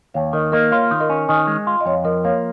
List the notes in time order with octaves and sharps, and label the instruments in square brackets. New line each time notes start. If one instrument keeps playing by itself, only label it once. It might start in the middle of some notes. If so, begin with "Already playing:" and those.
[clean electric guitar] D#2 [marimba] C#5 F5
[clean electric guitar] D#3 [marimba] A#4 D#5
[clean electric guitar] A#3 [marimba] A#4 D#5
[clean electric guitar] F4 [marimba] C#5 F5
[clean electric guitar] D#3
[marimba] A#4 D#5
[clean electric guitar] C#4
[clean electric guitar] D#3 [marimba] D#5 G#5
[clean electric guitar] G#3
F4
[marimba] D#5
[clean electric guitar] F2 [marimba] C#5 F5
[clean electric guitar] F3 [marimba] A#4 D#5
[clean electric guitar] A#3 [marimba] C#5 F5